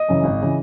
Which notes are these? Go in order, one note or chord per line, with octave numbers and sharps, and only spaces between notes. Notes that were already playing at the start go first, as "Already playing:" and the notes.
Already playing: D#5
F#2 C#3 E3
G#1
C#3 E3